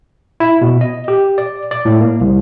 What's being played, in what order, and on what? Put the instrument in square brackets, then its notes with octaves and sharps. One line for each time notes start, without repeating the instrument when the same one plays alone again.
[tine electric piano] E4
B2
D#5
G4
D5
D5
A2
A#3
C2